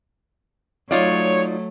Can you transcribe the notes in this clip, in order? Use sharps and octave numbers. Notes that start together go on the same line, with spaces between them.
F#3 A3 D#4 F4 C#5 D5